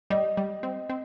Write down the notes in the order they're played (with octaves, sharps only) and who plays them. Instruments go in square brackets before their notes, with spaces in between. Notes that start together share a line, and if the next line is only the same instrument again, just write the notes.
[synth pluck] G3 [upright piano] D#5
[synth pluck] G3
C4
C4